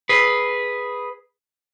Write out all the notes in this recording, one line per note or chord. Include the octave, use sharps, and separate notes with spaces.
G#4 B4